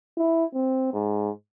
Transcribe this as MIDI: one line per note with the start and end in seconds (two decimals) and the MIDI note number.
0.17 0.45 64
0.54 0.90 60
0.93 1.30 44